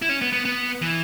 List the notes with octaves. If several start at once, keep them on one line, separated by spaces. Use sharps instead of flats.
E4
C#4
B3
B3
B3
E3